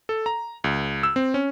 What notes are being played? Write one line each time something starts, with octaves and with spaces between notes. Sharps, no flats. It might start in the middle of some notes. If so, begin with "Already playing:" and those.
A4
A#5
C#2
E6
C4
C#4